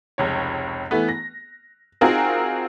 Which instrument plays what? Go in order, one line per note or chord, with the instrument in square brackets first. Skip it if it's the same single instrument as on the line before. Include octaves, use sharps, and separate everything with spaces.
[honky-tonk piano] F1 C#2 C#5
E3 A3 B3
A#6
C4 D#4 F4 F#4 G#4 A#4